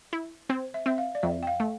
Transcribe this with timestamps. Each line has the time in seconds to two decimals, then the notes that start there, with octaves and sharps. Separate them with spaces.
0.13 E4
0.50 C4 C5
0.74 E5
0.86 C4 E5
0.98 F5
1.15 D5
1.23 F2 E5
1.43 G5
1.47 F5
1.60 A3